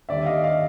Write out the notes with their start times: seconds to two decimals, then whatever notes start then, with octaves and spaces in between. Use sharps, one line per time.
0.09 D#2 D3 G3 D5 E5
0.26 D#5 F5
0.43 D#5 F5